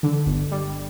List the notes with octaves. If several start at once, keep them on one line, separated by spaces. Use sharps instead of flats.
D3
G1
G3